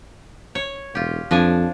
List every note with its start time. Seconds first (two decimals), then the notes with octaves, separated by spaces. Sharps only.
0.55 C#5
0.95 E1 F4 G4
1.31 F2 F3 D4 G#5